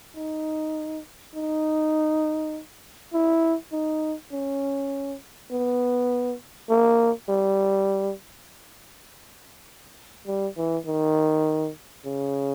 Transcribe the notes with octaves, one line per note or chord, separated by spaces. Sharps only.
D#4
D#4
E4
D#4
C#4
B3
A#3
G3
G3
E3
D#3
C#3